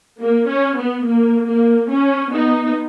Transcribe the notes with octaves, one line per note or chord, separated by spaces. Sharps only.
A#3
C#4
B3
A#3
A#3
C#4
B3 D#4